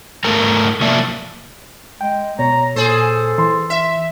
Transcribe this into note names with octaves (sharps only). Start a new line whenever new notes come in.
G#2 A3 A#4 A5 A#5
C3 F3 A#3 D5 E5 A5
G#3 G5
B2 C#5 A#5
A#2 G#4 A4 C5
E3 C6
E5